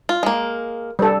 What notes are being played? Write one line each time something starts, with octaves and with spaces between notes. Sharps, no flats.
F4
G#3 A#3
G3 A4